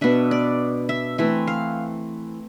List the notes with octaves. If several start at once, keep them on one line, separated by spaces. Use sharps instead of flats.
B2 B3 D4 E5
D5
E5
E3 A3 C4 E5
F5